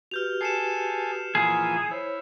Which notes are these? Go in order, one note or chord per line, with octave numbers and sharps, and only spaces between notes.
F#4 G4 B4 F6 G6 F7
G#4 A4 C7 C#7 E7
A#2 E3 F3 G#4
E4 C5 C#5